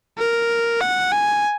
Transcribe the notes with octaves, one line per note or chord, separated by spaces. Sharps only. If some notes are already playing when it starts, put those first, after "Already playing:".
A#4
F#5
G#5